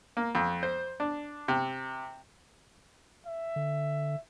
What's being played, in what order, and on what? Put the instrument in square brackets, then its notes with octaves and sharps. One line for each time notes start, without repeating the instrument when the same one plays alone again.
[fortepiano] A#3
F2
C5
D4
C3
[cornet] E5
[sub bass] D3